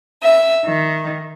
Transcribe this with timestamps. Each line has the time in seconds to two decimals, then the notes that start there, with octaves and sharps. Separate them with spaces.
0.21 E5
0.64 D#3